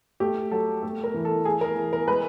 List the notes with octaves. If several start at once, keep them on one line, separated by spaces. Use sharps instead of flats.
A3 G4
F#3 A4
A3
A#4
E3
A4
A3 G#4
A#4
E3
A#4
G#3 B4